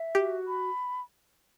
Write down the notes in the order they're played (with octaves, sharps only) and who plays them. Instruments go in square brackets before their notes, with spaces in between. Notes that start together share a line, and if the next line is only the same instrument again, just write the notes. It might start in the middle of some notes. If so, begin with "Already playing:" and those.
Already playing: [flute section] E5
[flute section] F#4 [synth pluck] G4
[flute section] B5